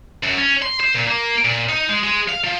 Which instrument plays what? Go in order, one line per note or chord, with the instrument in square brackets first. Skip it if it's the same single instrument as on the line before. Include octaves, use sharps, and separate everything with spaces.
[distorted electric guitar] F#2
C#4
C6
C5
A#2
A#3
A#2
D#4
G#3
G#3
F5
F3